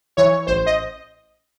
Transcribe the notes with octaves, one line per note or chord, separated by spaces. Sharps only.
E3 C#5
A1 C5
D#5